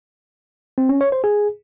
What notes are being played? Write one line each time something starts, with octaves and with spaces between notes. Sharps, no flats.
C4
C#4
C#5
C5
G#4